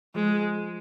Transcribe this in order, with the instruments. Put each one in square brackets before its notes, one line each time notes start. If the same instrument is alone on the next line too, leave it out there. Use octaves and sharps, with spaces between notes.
[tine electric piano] F3 [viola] G#3